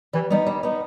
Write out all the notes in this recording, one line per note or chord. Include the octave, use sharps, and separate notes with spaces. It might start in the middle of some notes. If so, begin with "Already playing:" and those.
E3 G3
G3 B3 D#4
G3
B3 D#4